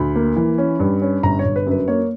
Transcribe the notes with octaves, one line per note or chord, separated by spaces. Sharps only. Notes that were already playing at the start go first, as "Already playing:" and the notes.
Already playing: D2 B5
A#3
E3
C#4
G2
C#4
G1 A#5
C#5
G1
B4
F#2 B4
A#3 C#5